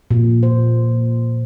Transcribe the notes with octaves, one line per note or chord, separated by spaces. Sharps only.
A#2
C5